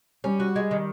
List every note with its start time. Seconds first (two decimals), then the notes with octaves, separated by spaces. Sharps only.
0.24 G3 C#4
0.40 F#4
0.56 G#3
0.71 D#3